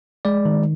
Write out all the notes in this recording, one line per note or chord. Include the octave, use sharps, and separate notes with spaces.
G#3 D5
D#3